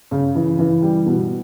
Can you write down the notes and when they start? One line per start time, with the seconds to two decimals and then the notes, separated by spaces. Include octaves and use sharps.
0.11 C#3
0.35 E3
0.59 E3
0.82 G3
1.06 B2